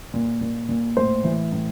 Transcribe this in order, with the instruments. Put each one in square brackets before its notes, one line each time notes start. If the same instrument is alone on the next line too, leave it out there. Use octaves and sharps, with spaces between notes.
[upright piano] A#2
A#2
A#2
A2 C5
E3
A2